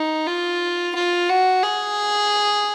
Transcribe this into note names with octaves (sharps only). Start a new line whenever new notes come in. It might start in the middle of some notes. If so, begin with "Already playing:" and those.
Already playing: D#4
F4
F4
F#4
G#4